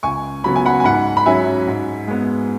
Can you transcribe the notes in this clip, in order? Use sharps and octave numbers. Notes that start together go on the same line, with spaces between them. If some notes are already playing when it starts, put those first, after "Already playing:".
C#2 G#5 C#6
C#3 F#3 B3 B5
G#5
F#5 B5
G#5
G#2 F#5 B5
B5
F#3 C#4 E5 G#5
G#2
G#3 B3